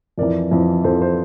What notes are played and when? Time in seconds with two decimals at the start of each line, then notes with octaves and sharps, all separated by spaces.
0.18 F2 E3 A#4 D5
0.51 F2 E3
0.84 F2 E3 A4 C5
1.01 A4 C5